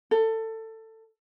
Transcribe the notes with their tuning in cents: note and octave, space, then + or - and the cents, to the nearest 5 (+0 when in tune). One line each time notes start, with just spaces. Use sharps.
A4 +20